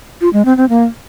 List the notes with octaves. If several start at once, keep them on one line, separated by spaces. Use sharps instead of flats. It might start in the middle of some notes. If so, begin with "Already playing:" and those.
F4
G#3
C4
C4
A#3